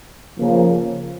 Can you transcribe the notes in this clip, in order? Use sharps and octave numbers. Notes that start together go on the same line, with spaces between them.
C#3 F3 A#3